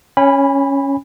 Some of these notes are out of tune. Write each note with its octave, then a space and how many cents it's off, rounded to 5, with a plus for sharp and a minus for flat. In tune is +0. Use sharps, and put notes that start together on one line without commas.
C#4 +0 G#5 -35 B5 -5